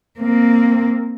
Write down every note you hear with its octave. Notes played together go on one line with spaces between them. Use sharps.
A#3 C4